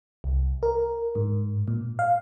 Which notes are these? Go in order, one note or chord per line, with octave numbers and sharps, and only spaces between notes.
C2
A#4
G#2
A#2
F5